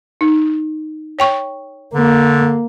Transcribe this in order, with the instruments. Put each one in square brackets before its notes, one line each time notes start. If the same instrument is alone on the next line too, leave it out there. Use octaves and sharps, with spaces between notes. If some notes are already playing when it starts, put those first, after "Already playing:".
[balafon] D#4
C#5 G5 C#6
[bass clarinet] D3 [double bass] A#3